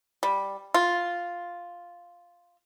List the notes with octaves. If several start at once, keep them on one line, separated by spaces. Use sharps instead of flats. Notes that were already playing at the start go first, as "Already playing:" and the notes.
G3
F4